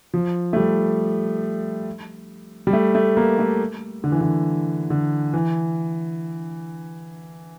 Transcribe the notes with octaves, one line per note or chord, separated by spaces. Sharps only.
F3
A3
G3
G3
A3
A3
A#3
A3
D3
E3
D3
D3
E3